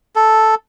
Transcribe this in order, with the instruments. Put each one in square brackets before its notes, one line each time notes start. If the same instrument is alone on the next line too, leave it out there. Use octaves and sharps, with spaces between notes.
[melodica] A4